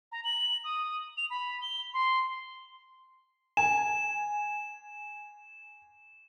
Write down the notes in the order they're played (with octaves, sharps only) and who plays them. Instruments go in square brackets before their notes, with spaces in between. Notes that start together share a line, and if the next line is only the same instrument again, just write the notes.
[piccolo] A#5
F#7
D#6
F7
B5
G7
C6
[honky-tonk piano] G#5 [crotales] E7